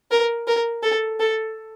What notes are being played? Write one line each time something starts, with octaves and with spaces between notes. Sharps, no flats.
A#4
A#4
A4
A4